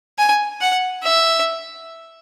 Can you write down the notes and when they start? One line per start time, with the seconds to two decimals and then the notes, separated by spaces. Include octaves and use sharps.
0.18 G#5
0.61 F#5
1.03 E5